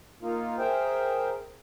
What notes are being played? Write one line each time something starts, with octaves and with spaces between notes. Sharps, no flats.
A#3 D#4 F4
G#4 A#4 C5 E5 G5